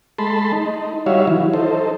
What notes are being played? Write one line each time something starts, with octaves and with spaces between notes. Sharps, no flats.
G#3 A3 A5 B5 C6
D#4
G3 D#4 F#4 C#5 E5 F5
E3 F#3 E4
D#4 A4 C5